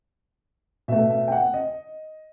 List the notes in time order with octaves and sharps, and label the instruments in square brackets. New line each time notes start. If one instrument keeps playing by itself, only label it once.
[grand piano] B2 A3 E5
E5
G5
F#5
D#5